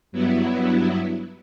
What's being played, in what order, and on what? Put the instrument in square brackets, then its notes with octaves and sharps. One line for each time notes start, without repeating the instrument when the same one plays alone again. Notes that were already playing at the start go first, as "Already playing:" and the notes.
[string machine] G2 F#3 B3 E4